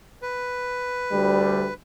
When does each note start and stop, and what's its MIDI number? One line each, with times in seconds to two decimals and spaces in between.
0.22 1.74 71
1.12 1.68 38
1.12 1.68 55